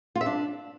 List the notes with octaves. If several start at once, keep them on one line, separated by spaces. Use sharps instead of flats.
F4
E5
D4